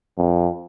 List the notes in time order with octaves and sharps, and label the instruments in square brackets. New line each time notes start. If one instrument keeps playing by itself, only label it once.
[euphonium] F2